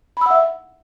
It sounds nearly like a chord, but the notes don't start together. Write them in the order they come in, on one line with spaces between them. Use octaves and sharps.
B5 E6 F#5 E5